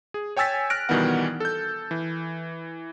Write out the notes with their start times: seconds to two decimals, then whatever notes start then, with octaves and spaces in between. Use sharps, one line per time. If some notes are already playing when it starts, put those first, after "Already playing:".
0.14 G#4
0.37 C#5 G5 G#5 E6 A6 B6
0.70 F6 F#6 A#6 D7
0.89 B2 D#3 E3 G3 B3 F#5
1.40 A4 G6
1.91 E3